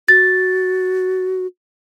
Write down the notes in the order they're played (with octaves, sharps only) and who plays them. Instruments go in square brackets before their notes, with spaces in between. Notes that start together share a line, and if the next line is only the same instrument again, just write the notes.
[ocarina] F#4 [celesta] A6